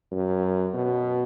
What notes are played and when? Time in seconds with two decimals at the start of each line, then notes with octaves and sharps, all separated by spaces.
0.11 F#2
0.74 B2